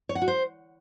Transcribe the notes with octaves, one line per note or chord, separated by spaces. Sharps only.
C#5
F#5
F#4
C5